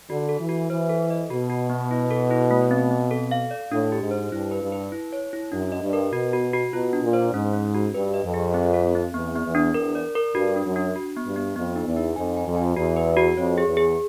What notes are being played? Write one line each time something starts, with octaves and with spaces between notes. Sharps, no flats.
D3 F#4
A4
E3
F#4
E3 C5
A4
D#5
B2 F#4
F#4
B3
E4
A4
E4
A3
C4
C4
A4
F5
D5
A2 D4
G4
G#2
C5
G2 E4
B4
G2
B4
E4
C#5
E4
F#2 D4
D#5
G2
A#4
B2 F#4
F#4
F#4
B2 F4
D4
A#2
C5
G#2 C#4
C#4
F#4
G2 B4
D#5
F2
G#4
C4
A4
C4
E2 B3
B3
E2
D4
E2 A#4
D5
A#4
G2 F#4
D4
F#2
D4
F#4
B3
G2
B3
F2 B3
D#4
E2
D#4
F2 G#5
G#5
F2
G#5
E2 F#4
B4
F#4
F2 C#5
G#4
E2
G#4